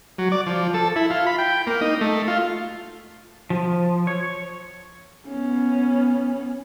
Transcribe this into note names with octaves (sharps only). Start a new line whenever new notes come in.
F#3
D5
F3
A4
E4
F4
B5
G5
A#3
D#4
A3
F4
F3
C#5
B3 C#4